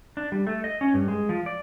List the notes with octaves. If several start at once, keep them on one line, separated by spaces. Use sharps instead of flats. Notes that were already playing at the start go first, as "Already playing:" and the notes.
D4
G3
A3
D#5
C#4
G2
G#3
F3
D5